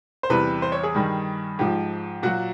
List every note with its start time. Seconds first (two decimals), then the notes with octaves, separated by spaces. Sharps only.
0.23 C5
0.30 E2 C3 E3 G3 B4
0.62 C5
0.72 C#5
0.83 G#4
0.94 G2 D#3 G3
1.59 G#2 F3 G4
2.23 A#2 F#3 F#4